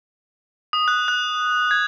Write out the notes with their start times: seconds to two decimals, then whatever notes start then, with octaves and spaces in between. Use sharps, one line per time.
0.73 D#6
0.88 F#6
1.08 F#6
1.71 G#6